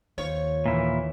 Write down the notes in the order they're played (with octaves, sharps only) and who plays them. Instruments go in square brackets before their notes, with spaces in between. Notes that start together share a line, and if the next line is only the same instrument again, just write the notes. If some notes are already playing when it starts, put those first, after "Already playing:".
[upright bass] D#2 [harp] F4 C5 [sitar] C#5
[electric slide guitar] A#2 E4 [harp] E3 D#4